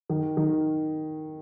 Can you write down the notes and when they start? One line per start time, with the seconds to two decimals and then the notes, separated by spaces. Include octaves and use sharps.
0.10 D#3
0.37 D#3